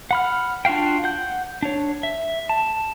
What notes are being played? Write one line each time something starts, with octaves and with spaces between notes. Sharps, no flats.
F#5 B5 F6
D4 F4 F#4 F5 G5
F#5 G6
D4 C#5
E5
A5